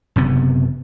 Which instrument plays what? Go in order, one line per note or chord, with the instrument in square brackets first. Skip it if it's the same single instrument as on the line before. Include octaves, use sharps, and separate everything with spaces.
[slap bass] F#1 C3 B3